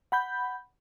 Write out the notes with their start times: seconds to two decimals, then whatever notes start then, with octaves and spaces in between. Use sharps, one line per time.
0.12 F#5 B5 G6